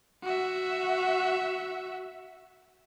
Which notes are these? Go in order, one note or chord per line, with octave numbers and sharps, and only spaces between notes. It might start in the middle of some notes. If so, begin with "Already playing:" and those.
F#4 E5